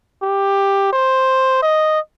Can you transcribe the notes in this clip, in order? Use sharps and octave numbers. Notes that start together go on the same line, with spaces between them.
G4
C5
D#5